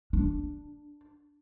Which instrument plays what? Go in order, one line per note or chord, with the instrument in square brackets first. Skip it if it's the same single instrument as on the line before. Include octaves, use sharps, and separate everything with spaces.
[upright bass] D4